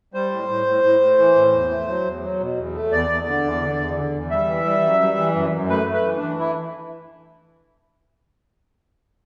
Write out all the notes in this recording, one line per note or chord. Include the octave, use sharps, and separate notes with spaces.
G3 C5
A2
A2
A2
A2
A2
E3
A2
E2
A3
F#3
E2
F#3
B2
E2
A3
E2 D5
E2
D3
E2
D3
E2
D3
E2
G3 E5
E3
G3
F#2
G3
E3
F#2
F#2
A3 B4
A3
B4
E3
D4
E3
E4